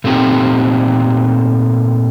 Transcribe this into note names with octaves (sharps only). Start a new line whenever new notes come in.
A#2 A3 C4 D#4 G4